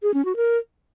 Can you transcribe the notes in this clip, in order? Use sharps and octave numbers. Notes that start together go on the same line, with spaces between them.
G#4
C#4
F#4
A#4